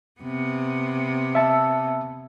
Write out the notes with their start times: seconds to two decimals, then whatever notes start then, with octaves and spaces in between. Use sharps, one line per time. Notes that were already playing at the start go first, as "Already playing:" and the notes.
0.20 C3 B3
1.35 E5 A5 E6